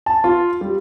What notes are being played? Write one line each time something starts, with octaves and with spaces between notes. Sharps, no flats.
A5
F4
G3